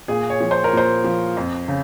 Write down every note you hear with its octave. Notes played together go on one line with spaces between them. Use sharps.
A#2 G#4
C#5
F3
C5
A#4
A#2 C5
F3
F2
C#3